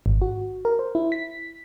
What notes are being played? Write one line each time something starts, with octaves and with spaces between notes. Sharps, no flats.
G#1
F#4
A#4
C5
E4
B6